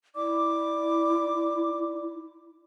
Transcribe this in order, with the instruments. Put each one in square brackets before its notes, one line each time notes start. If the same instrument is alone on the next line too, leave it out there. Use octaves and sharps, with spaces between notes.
[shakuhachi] E4 [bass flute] D5 [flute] D6